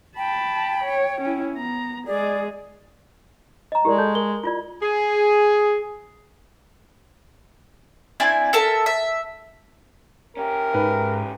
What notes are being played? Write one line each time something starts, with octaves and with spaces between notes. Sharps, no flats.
G5 A5 B5
C#5
C#4 E4
B3 A#5
G#3 G#4 D5
D#5 A#5
G#3 E4 G4 A#4 D5
A4 A5 G6
A#4 D#5 G7
E4 F4 D5
G#4
C4 D4 E4 G#5
A4 A#4 E5 A5
E5
C#4 G4 A#4
G#2 B4